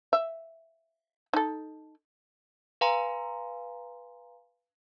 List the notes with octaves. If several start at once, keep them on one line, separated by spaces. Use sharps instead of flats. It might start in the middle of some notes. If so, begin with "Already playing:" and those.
E5
D#4 A4
B4 F5 G#5 A#5 C6